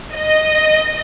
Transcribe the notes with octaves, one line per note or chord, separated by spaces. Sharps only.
D#5